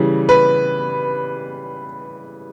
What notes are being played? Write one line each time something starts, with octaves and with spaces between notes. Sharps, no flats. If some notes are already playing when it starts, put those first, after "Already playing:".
Already playing: C#3 E3 G3
B4